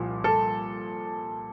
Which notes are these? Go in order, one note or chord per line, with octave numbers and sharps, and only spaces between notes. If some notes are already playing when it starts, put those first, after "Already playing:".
Already playing: C2 A#2 F3
A4